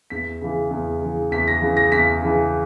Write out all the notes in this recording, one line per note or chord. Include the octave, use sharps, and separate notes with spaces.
E2 B6
C#3 E3
E2
C#3 E3
E2 B6
A#6
C#3 E3
A#6
E2 B6
C#3 E3